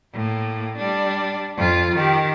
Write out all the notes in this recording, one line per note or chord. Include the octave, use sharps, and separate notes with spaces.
A2 A#3
G3 D4
F2 F4
D#3 G4